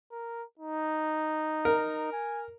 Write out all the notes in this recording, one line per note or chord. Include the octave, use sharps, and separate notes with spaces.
A#4
D#4
A#4
G#5